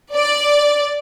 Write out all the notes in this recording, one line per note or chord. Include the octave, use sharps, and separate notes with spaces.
D5